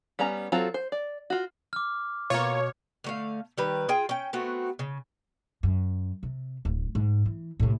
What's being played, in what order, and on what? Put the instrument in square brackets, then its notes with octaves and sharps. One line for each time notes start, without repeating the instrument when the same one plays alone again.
[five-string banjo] G3 B3 C#4 A#5
F#3 C4 F4 A4
C5
D5
F4 F#4
[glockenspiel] D6 F6
[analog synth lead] B2 [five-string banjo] A#3 F4 [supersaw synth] C#5
[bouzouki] D3 A3 F5
D#3 G3 B4
F4 G#4 G5
C#4 G5
A3 B3 C4 F#4
C#3
[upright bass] F#2
C3
D1
G#2
E3
A2 C3